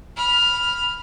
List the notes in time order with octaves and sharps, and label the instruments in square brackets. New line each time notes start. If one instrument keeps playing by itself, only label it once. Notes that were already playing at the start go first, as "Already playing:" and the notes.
[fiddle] B5 F6